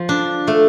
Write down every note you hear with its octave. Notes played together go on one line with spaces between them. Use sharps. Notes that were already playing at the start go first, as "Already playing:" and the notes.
Already playing: F3
D4
A3